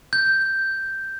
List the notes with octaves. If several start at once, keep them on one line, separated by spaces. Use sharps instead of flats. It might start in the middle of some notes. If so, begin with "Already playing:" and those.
G6